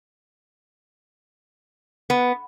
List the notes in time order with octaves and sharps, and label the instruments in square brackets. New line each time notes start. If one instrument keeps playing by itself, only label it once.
[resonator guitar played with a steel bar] B3